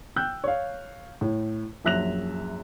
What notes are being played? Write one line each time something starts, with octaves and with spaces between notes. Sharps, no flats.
G5 E6 F#6 G6
C#5 F5
A2
A#1 F#2 E5 F#6 A#6 F7